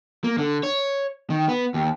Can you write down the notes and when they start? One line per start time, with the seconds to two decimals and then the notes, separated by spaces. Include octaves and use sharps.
0.24 A#3
0.38 D3
0.63 C#5
1.30 D#3
1.49 B3
1.74 D#2